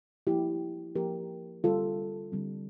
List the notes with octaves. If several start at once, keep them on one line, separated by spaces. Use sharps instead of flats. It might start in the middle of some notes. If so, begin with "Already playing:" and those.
F3 A#3 E4 G4
F3 A#3 G4 A#4
D3 G3 C4 F4 A4
D3 G3 C4